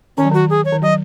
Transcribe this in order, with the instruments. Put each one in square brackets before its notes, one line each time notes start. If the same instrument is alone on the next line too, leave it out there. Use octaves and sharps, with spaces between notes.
[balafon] D#3 [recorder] C#4
[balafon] F#3
[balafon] D#3 [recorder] F#4
[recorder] G#4
C#5
[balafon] D#3
[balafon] F#3 [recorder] D#5